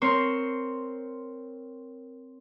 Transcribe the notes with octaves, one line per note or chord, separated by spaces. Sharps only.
C4 A#4 C5 C#5